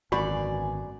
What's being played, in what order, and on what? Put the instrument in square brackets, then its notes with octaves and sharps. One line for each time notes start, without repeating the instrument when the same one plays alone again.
[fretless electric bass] G#1 [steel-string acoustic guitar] F#2 D5 [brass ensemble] D3 B3 G#5 [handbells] F#4 B5